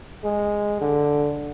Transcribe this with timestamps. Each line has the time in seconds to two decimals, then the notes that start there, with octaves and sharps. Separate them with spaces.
0.24 G#3
0.81 D3